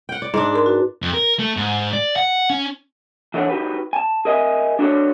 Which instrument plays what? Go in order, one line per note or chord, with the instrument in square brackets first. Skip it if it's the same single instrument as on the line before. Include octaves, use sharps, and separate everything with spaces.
[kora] F#5 G5
D5
G#2 D4
[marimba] G#4 A#4 C6
F#4 B4
[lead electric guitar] F2
A#4
A3
G#2
D5
F#5
C#4
[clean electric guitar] E3 D4 A4 C#5 F#5
D#4 F#4 G4 B4
G#5 A5
G#4 A#4 D#5 E5 F#5 G#5
D4 F#4 A4 C#5 D5